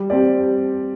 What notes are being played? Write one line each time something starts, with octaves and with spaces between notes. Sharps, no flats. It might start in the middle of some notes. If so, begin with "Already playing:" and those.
Already playing: G3
C4 G4 D5